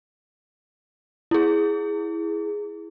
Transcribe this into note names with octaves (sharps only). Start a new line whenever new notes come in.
E4 G#4